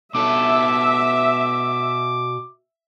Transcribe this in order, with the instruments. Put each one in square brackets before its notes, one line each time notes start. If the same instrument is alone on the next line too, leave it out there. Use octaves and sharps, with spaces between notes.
[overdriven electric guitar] B2 A4 [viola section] E5 [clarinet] D6